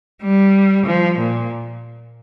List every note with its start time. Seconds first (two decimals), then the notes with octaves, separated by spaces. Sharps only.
0.22 G3
0.86 F3
1.19 A#2